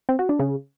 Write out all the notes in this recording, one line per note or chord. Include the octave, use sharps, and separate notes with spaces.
C4
F#4
D4
C#3